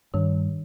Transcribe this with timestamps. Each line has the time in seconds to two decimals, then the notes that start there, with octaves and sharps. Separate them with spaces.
0.14 G2 D#3